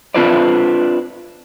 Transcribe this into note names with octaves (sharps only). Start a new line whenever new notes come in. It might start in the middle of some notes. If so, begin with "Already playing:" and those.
C4 D4 F4 B4 C5 D5